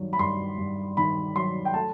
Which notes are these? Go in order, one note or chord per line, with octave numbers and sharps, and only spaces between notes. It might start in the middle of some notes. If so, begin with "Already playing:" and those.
Already playing: G2 D#3 F#3
B5
G2 C6
G2
D#3 B5
F#3 C6
G5
A3 A5